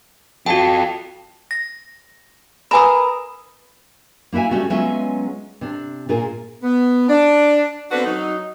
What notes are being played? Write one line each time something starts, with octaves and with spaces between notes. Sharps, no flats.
F4 F#4 A4 G5
A#6
A#4 B4 G#5 B5 D#6
A#3 E4 F#4 E5 G#5
G3 A3 C#4 F#4
F#3 G#3 B3 C#4 F4 E5
C3 D4
A#2 F4 G#4 A#4
B3
D4
B3 C4 D4 F#4 A4 B4
F#3 D#4